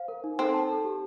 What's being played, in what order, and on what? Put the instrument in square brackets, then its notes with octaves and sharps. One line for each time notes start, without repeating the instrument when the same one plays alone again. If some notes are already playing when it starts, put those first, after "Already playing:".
Already playing: [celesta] C5 F5
A#4
D#4
[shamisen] C4 [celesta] A4
[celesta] A5
A4
G4